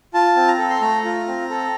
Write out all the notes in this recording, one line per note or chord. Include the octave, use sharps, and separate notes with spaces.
F4 A5
C4
A#5
A4
C6
A3 A#5
F4
C4
A4